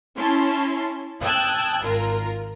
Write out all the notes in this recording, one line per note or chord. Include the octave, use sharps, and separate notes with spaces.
C#4 E4 A5 C6
G5 A5 D#6 E6 F#6 G#6
G#1 F4 A#4